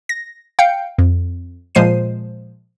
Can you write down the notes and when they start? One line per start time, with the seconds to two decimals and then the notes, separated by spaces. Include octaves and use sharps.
0.09 A#6
0.59 F5 G5 G6 C#7
0.99 F2
1.75 A#2 F3 G#3 C5 C7 D#7